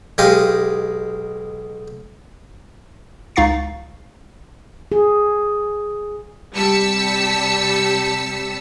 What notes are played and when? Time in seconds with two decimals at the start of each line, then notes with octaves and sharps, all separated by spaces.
0.18 B1 G#3 G4 D#5 F5 D#6
3.36 C#2 D#4 F5 C#6 A6 C7
4.92 G#4
6.54 C3 G3 A5 E6 B6 C#7